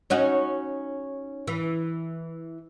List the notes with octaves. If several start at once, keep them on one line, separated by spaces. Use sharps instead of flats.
C#4 D#4 F#4
E3